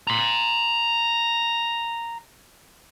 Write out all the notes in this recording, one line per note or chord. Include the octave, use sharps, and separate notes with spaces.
A#5 C6